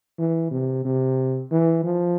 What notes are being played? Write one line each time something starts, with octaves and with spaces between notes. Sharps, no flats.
E3
C3
C3
E3
F3